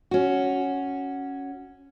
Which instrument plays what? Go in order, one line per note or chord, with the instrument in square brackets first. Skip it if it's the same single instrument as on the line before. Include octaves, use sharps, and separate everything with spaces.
[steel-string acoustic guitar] C#4 F#4